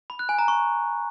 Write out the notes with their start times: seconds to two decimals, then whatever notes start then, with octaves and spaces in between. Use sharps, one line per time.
0.10 B5
0.19 F#6
0.29 G#5
0.39 A#5
0.48 C#6